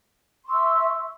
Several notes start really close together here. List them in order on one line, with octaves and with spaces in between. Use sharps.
C6 C#6 E6 E5